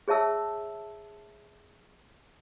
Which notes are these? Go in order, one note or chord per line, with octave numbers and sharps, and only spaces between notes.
G#4 C#5 E5 A5 E6